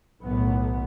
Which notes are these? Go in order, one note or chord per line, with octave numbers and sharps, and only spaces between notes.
B1 A2 D#3 B3